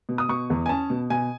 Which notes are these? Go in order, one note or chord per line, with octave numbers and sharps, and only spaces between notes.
B2
D#6
B2 C#6
E2
G#5
C#4 A5
B2
B2 G#5